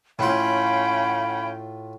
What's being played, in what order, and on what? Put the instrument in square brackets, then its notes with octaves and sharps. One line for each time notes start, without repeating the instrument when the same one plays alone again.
[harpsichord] A2 F4 [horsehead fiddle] C#4 G5 [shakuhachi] F5 [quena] B5